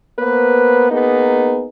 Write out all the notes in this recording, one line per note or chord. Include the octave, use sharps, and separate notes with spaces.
A#3 B3 B4 C5
A#3 B3 D#4 G#4